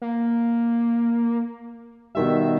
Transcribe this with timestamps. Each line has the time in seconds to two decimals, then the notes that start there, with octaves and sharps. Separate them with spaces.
0.02 A#3
2.15 B2 D#3 G3 E5